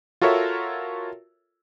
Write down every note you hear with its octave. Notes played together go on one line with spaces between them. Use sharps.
F4 F#4 A4 A#4 C#5 E5